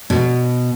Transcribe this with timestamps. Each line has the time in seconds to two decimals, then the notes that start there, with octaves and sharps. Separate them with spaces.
0.10 B2